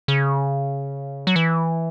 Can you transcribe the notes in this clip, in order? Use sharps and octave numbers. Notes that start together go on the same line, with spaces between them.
C#3
F#3
E3